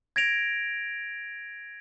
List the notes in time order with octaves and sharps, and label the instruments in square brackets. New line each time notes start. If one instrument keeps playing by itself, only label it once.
[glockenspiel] G#6 A#6 D7 F7